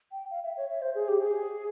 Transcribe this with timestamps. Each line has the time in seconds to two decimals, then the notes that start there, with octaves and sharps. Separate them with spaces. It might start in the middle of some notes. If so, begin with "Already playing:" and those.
0.12 G5
0.31 F5
0.44 E5
0.57 C#5
0.70 E5
0.82 C5
0.95 G#4
1.08 G4
1.21 G#4